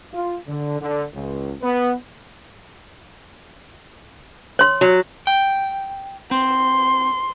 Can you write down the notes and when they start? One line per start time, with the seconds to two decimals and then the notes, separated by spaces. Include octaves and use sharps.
0.13 F4
0.47 D3
0.80 D3
1.13 C#2
1.61 B3
4.59 C#5 C6
4.81 F#3
5.27 G5
6.31 C4 C6